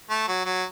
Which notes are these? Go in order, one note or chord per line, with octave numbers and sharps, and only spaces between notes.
A3
F#3
F#3